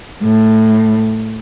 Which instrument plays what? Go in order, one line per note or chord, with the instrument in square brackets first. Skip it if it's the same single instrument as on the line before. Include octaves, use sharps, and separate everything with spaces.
[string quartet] A2